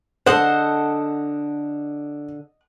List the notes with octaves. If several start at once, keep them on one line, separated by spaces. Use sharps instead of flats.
D3 A4 C5 D#5 F#5